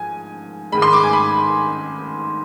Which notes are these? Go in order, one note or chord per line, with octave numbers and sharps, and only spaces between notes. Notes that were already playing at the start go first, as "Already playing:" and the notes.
Already playing: G#2 F3 G#5
G#2 D#3 G#3 B5
C6
D6
G#5
B5